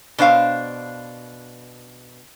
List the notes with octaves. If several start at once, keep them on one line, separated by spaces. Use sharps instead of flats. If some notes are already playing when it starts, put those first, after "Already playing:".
B2 D4 C5 F5